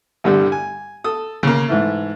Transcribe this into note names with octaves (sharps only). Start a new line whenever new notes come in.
C2 G2 D3 G3
G#5
A4 D#6
C#3 A#3
G#2 E3 A3